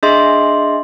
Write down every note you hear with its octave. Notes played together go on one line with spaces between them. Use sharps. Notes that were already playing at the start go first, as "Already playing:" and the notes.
D4 G#4 D#5 E5 C6